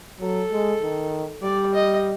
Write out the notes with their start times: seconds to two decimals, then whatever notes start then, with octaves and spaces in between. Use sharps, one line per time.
0.20 F#3 A4
0.52 G#3
0.82 D#3
1.43 G3 D5
1.74 D#5